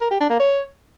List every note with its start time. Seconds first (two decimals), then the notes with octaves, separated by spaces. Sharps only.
0.01 A#4
0.11 G4
0.20 D4
0.30 A#3
0.40 C#5